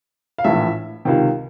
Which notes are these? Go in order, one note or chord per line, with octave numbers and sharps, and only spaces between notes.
F5
A#1 A2 E3 E5
C#2 C3 D#3